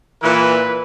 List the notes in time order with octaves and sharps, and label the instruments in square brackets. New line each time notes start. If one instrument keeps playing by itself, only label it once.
[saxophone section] A#2 E3 [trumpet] B4